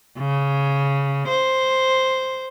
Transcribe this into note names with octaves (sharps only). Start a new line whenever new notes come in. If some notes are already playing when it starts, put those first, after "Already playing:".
C#3
C5